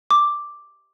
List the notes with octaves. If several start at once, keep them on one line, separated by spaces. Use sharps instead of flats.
D6